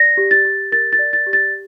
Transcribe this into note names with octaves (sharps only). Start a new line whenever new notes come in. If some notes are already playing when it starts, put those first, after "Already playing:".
Already playing: D5 A#6
G4
A6
G4
A#4 A6
A6
D5
A6
G4
A6